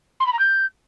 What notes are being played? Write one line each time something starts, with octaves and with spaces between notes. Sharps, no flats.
C6
B5
A#5
G6